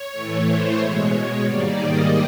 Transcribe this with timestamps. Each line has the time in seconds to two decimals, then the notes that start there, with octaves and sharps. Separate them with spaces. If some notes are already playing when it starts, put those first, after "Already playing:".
Already playing: C#5
0.12 A2 E3 A3
0.45 C5
0.78 B2 G#3 C#5
1.44 G#2 D#3 G3 A#3 D5
1.77 D#5